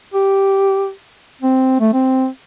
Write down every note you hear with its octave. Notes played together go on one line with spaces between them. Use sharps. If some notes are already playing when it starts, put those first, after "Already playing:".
G4
C4
A3
C4